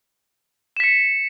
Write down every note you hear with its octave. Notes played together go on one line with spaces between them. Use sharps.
B6 C#7 E7